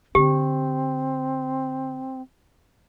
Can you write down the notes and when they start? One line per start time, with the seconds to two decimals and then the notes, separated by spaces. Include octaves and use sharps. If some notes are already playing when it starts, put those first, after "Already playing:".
0.15 D3 C4 G4